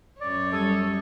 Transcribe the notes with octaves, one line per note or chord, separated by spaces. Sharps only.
F#2 C#5 D5
G3 A4 D#6 G#6